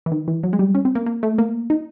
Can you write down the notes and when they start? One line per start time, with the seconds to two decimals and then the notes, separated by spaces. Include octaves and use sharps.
0.06 E3
0.12 D#3
0.28 E3
0.43 F#3
0.53 G#3
0.59 G3
0.75 C#4
0.85 C4
0.95 A#3
1.06 A#3
1.23 A3
1.38 A#3
1.70 D#4